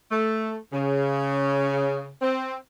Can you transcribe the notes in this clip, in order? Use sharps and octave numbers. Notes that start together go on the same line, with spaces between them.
A3
C#3
C4